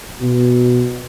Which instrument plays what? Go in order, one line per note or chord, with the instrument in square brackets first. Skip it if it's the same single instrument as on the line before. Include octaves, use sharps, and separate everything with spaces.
[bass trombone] B2